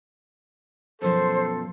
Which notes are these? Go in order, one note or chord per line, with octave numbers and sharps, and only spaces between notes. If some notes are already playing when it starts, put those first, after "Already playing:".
F#2 B2 F3 A4 C5